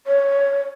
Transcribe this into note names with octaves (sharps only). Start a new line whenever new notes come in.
C#5